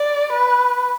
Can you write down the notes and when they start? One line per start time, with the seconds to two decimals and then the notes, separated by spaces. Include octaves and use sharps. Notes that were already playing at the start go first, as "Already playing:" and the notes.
Already playing: D5
0.33 B4